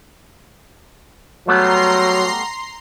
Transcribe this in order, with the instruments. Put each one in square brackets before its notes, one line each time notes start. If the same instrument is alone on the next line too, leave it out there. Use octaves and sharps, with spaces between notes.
[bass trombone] F#3 [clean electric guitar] G3 A3 B3 [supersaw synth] A#5 C6 C7